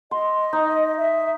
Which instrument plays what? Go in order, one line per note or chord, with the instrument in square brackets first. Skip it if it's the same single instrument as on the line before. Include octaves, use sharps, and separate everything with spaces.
[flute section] D#5 [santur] C6
[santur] D#4
[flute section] E5